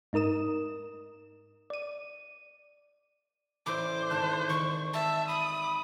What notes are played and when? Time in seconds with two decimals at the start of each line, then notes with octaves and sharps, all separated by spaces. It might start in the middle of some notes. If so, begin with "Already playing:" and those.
0.13 G#2 D#4 A#4 D#6 E7
1.70 D5 D#7
3.66 A1 E4 C5 D5 D6
4.10 G#1 A5 F#6 E7
4.49 D#3 D5 C6 C#6
4.93 E5 A5
5.28 B5 D#6